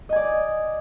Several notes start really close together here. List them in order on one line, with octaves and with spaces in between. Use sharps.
D#5 G#5 D5